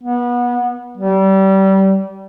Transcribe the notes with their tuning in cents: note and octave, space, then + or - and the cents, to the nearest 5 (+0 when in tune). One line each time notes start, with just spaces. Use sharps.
B3 -25
G3 -25